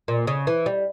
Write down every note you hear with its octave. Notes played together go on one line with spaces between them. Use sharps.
A#2
C#3
E3
G3